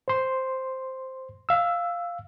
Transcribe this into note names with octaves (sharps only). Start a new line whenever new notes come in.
C5 C6
F5 E6